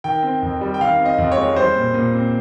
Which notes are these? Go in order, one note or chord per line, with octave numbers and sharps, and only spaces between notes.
D#3 G5
C4
F2
G3
G5
D#3 F5
C4
D#5
F2
C#5
G#3
G3 C5
A#2
A#2
C4